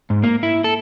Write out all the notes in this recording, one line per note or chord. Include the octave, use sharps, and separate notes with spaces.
G#2
A#3
E4
A4